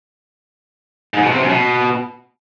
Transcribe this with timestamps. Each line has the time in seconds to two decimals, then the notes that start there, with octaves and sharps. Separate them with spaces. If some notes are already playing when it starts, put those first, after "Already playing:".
1.14 G#2
1.23 B2
1.31 C3
1.40 F#2
1.49 B2